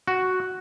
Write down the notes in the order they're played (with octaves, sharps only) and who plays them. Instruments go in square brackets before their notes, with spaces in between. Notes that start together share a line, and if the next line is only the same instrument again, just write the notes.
[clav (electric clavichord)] F#4